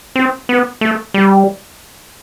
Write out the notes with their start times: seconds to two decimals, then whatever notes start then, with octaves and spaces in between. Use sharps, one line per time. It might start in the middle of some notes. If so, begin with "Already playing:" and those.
0.16 C4
0.49 B3
0.81 A3
1.14 G3